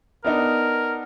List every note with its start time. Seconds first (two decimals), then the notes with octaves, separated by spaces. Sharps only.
0.25 B3 D4 D#4 A#4